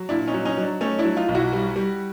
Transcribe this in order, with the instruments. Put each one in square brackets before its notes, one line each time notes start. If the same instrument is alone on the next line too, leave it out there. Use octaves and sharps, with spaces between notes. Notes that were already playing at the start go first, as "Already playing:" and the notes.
Already playing: [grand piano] F#3
A#2 D4 E4
C#4 D#4
F#3
C#4 D#4
F#3
D4
A3 C#4 D#4
D4 E4
F#3
D#4 F4
B1
E4 F#4
G3
G3